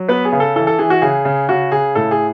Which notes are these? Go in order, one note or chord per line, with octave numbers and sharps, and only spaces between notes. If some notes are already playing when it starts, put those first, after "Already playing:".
Already playing: F#3
B3 B4
G#4
C#3
A4
E3 A4
A4
E3 G#4
F#4
C#3 G#4
C#3
C#3 F#4
C#3 G#4
A2 A4
G#4